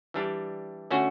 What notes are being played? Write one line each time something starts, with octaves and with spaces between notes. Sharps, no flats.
E3 G3 D4 G4
D3 A3 C#4 F#4